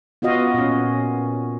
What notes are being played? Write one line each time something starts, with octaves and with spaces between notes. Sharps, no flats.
B3 F4 F#4 D#5 F5
A#2 C#4